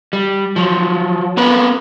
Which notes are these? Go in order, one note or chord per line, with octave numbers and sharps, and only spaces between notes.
G3
F3 F#3
B3 C4 A#4 B4